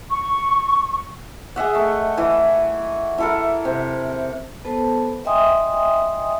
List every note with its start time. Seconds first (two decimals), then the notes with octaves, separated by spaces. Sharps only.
0.09 C#6
1.56 G#4 D#5 E5 F#5
1.75 A3
2.17 E3 E4
3.18 E4 A4 A#4
3.65 C3
4.65 B3 A4 B4 C5 A5
5.25 D#5 E5 G5 G#5 C6 D#6